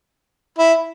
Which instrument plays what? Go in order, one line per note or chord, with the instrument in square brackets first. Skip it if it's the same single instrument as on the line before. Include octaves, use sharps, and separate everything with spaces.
[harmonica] E4